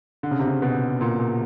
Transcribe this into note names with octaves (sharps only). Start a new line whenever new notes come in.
D3
C#3
C3
C#3
B2
A#2
A#2